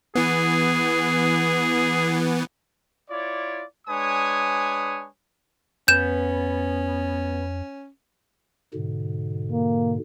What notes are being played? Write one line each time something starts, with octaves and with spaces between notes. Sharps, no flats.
E3 B3 G#4
E4 F4 C#5 D5
G#3 D4 B4 C#5 G#5 D#6
F2 B3 C#4 G6 E7
G#2 B2 D3
A#3